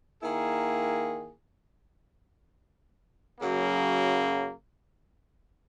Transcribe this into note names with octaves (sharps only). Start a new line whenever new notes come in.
D#3 A#3 E4 G#4
F#2 C#3 F#3 A#3